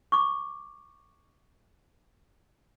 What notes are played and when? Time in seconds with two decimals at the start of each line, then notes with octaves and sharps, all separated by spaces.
0.12 C#6 D6